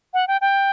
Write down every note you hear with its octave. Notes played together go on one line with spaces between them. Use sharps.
F#5
G5
G5